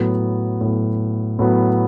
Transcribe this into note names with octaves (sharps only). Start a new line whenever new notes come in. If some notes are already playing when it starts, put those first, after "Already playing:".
Already playing: A2 F#3 B3
A2 F#3 B3
A2 F#3 B3